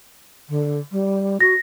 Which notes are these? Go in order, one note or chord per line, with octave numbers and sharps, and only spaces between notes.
D3
G3
F#4 A#6